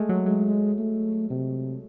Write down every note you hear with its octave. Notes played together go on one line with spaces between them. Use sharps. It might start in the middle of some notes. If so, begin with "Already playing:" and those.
Already playing: G#3 A3
F#3
F#3 G#3
A3
C3